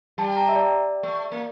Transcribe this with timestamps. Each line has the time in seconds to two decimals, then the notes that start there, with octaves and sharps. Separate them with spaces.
0.18 G3 A5
0.37 A#5
0.49 E5
0.56 D5
1.03 A3
1.32 A#3